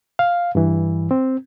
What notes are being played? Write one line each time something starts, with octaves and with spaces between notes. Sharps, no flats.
F5
G2 E3
C4